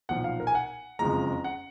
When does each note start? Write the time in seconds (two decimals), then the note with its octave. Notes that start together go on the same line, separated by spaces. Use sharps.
0.09 B1 A#2 F3 F#5
0.24 F5
0.40 A#4
0.47 G#5
0.55 F#5
0.99 F#1 F2 F3 G#3 A#5
1.44 F#5